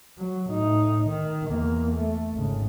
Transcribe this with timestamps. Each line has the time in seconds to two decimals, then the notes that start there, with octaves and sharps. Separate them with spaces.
0.18 F#3
0.50 A2 D#4
1.09 D#3
1.48 E2 A#3
1.96 A3
2.34 G#1 C#3